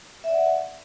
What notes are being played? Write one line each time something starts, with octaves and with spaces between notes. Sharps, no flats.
D5 E5 F#5